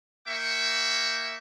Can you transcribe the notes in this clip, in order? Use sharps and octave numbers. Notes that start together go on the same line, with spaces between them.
A#3 E5 G5 C#6